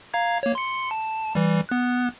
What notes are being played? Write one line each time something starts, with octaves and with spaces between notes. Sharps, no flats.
F5 A#5 G#6
A#3 C#5
C6 C#7
A5
E3 G3
B3 F#6